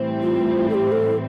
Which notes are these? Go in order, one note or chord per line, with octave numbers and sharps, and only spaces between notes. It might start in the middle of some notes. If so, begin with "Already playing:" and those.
Already playing: A2 E3 G3 C4
F4
A4
G4
A4